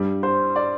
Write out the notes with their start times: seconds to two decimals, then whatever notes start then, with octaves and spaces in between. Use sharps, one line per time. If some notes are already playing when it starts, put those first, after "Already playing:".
Already playing: G2 G3
0.23 C5
0.56 D5